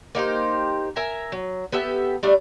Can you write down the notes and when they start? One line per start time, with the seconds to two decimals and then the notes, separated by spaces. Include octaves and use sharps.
0.15 A#3 D#4 G4 C5
0.96 A#4 E5 G#5 A#5
1.32 F#3
1.72 B3 G4 A4 E5
2.23 G3 A3 D4